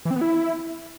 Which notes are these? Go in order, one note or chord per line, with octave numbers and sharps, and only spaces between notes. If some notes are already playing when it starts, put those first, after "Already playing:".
E3
C4
B3
E4